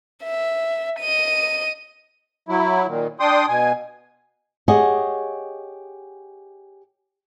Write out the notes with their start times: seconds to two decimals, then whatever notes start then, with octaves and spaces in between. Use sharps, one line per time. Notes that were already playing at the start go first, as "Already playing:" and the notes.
0.24 E5
1.00 D#5 D#7
2.49 F#3 E4
2.87 A#2 D#3
3.20 D4 G5 C6 D#6
3.48 B2 G#5
4.68 G4 G#4 C#5 D#5 F#5 G#5